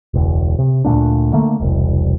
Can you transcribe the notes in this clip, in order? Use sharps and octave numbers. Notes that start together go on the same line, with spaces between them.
E1 C#2
C3
D2 A#2 A#3 D4
D3 A3 A#3
E1 C2